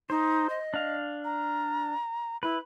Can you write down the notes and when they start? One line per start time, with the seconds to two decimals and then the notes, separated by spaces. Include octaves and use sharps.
0.10 D#4 C5
0.50 D#5
0.74 D4 F5
1.24 A#5
2.43 E4 B4